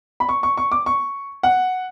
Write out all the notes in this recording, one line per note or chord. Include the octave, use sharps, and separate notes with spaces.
B5
C#6
C#6
C#6
D6
C#6
F#5